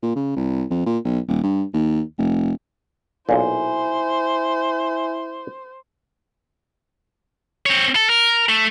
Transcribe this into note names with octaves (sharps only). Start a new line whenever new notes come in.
A#2
C#3
C2
F2
A#2
B1
D#1
G2
D#2
F1
B1 A#2 E4 C5 G#5
C4 C#5
A4
A#4
A3